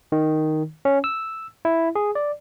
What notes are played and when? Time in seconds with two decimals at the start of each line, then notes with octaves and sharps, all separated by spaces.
0.12 D#3
0.85 C#4
1.04 E6
1.65 E4
1.95 G#4
2.15 D5